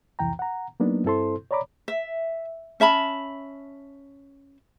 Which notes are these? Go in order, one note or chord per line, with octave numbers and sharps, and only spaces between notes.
C2 F2 E3 G5 A#5
F#5 A#5
F#3 A#3 B3 D4 D#4
G2 C4 E4 A4 C5 C6
C#5 D5 A#5 B5 D6
E5
C#4 E5 A5 B5